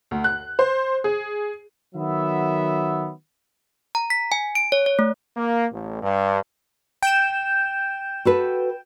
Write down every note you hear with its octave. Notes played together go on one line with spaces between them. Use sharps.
D2
F#6
C5
G#4
D#3 F#3 B3 E5
A#5
B6
G#5
D7
C#5
C#5
A3
A#3
A1
G2
G5 G6 E7
F#4 A4 B4